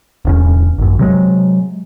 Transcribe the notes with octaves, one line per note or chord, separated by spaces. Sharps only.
D1 E2 C#4
G#1 F#2
C3 F#3 G#3